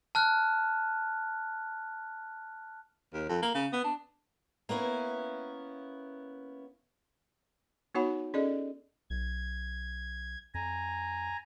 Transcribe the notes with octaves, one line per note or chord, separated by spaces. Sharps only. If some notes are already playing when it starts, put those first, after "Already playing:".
A5 F6 F#6
D#2
F2
A#3
C#3
B3
D4
A#3 B3 C#4 E4
B3 D#4 F#4 C#5 F#5 B5
C#4 G#4 A4 D5 D#5
B1 G#6
F2 G#5 A#5